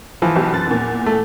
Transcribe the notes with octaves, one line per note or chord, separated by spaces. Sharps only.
E3 F3
B1 F#4 G4
F#2 F#6 A6
E2 A#2
A3